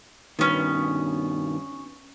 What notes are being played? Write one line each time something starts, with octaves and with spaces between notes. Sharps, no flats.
G2 B2 D#3 B3 C#4